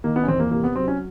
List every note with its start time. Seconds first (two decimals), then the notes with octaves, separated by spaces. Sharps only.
0.04 D#3 A#3
0.16 B3
0.23 C#4
0.27 E2 C4
0.39 A#3
0.51 C3 A#3
0.64 B3
0.75 F#3 C4
0.88 C#4